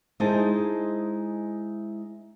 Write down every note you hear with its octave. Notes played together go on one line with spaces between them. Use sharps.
G#3 D#4 E4 G#4 C5 A5